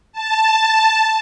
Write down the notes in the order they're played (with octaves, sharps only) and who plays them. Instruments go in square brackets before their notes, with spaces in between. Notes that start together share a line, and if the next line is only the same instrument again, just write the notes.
[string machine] A5